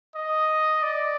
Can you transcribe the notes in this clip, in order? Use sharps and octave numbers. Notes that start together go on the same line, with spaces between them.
D#5
D5